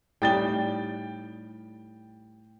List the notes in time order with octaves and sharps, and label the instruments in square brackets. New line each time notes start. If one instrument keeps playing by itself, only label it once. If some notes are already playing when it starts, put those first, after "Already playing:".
[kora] A2 G3 D#4 [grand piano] G5 A6 G7